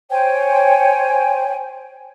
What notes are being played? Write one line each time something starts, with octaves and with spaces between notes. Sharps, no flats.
C5 C#5 G5 G#5